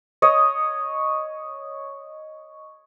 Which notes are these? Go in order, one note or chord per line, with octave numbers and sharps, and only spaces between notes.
C#5 D#5